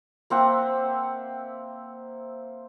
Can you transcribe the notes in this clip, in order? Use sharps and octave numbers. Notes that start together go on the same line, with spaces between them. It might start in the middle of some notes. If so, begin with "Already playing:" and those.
A#3 C4 E5 F#5